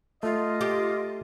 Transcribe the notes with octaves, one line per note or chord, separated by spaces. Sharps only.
A3 F4 D#5
G4